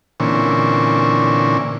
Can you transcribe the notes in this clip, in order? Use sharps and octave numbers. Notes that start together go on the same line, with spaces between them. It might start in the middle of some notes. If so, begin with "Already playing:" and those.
A#2 D3 E3 C4 C#4